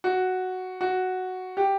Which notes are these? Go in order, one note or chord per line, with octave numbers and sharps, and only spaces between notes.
F#4
F#4
G4